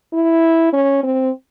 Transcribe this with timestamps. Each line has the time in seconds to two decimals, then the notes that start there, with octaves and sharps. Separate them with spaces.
0.13 E4
0.73 C#4
1.03 C4